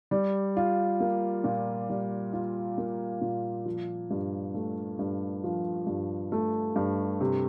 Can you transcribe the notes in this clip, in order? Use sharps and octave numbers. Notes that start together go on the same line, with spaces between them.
G3
F4
A#3
A#2
G3
F4
A#3
A#2
F3
G2
A3
G2
F3
G2
A3
G2
C3